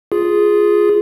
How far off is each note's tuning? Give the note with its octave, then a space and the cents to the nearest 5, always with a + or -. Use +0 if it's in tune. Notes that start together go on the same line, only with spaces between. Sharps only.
F4 +0 G#4 +0